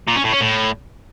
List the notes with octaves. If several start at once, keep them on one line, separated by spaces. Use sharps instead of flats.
A#2
C#4
A2
C#4
A2